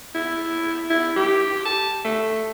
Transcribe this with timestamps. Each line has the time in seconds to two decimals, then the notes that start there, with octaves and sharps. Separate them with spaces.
0.15 E4
0.90 E4
1.16 G4
1.65 A5
2.05 A3